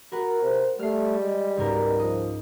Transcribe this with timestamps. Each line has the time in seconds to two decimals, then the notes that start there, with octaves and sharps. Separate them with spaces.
0.12 F#4 A#4 B4 F#5
0.42 C3 C5
0.79 G3 A3 F6 C7
1.20 G#3
1.57 C#2 G#2 B2 A#4
1.99 F3 D#5